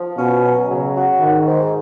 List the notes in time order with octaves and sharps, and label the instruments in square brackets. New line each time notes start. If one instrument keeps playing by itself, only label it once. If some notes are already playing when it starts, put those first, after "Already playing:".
Already playing: [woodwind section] F3
[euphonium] B2 [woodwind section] C#4
[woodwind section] F#3
[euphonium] C#3 [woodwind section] F#3
[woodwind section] F#4
[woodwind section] G#2 [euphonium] D#3
[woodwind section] G#2